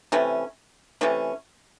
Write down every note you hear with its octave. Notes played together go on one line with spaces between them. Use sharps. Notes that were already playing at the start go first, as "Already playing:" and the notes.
C3 E3 A3 C#4
C3 E3 A3 C#4